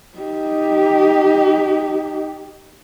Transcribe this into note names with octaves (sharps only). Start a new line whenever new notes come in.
D#4 G4